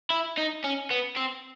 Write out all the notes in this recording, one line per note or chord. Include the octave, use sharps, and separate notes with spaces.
E4
D#4
C#4
B3
C4